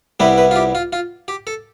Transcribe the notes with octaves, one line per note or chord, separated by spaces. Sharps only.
C2 C3 G3 B3 E4 B4
B4
F4
G4
F4
F4
G4
A4